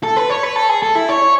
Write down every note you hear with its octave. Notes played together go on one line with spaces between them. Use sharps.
A4
B4
C#5
B4
A4
G#4
A4
E4
C#5